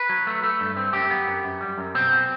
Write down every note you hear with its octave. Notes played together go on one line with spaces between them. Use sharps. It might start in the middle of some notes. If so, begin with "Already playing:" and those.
Already playing: B4
F#3
A3
A3
G2
C4
F#2 G4
B3
F#2
F#2
G3
F#2
B2 C4
B2